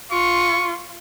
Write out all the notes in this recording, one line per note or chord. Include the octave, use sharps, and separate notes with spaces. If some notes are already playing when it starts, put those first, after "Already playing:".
F4 C#6